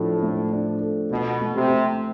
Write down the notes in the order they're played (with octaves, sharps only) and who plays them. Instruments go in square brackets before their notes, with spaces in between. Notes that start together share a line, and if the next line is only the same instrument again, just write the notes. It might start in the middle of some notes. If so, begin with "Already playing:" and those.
Already playing: [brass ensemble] A2 [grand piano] F3 D4 A4
[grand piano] A3
D4
A4
[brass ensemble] B2 [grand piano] F4
[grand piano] A3
[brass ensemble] C3
[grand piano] A3